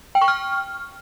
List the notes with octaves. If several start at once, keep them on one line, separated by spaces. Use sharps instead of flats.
G5
C#6
F6